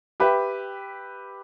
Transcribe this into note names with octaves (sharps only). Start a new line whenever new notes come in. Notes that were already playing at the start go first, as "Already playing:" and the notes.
G4 B4 E5